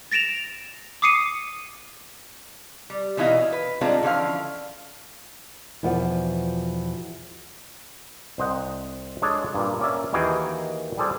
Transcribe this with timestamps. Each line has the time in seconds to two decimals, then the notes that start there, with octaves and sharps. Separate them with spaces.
0.11 A6 A#6 D7 E7 F7
1.02 D6 D#6 C7 C#7 D#7
2.90 G3
3.17 B2 E3 D#4 E4 D#5 F5
3.52 B4
3.81 D#3 G3 G#3 C4 D4 F4
4.02 D3 E3 F3 C#4 F5
5.83 E2 B2 F3 B3 D5 F#5
8.38 C2 C5 D#5 F#5
9.22 G#3 D4 G#4 A4 C#5 D5
9.54 G2 A#2
9.79 A#3 C#4 D5 E5
10.13 D#2 D#3 E3 F#4 G#4 G5
10.97 G3 G#4 A4 C5 D5